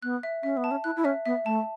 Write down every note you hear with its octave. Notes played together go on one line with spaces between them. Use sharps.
B3 F#6
E5
C#4 E5
B3
A5
C#4
E4 F#6
E4
C#4 E5
B3 E5
A3 A5